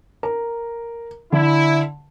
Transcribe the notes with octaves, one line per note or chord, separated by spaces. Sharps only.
A#4
D3 E4